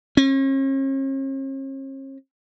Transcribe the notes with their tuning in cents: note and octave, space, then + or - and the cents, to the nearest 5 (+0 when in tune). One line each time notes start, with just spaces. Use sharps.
C#4 -45